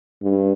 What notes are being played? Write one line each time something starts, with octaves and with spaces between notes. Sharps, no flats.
G2